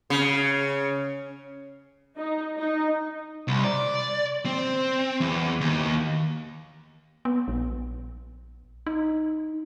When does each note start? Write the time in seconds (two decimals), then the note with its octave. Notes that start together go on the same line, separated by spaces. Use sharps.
0.10 C#3
2.16 D#4
2.57 D#4
3.48 C2
3.64 D5
4.46 C4
5.20 E2
5.61 D#2
7.25 B3
7.48 A#1
8.87 D#4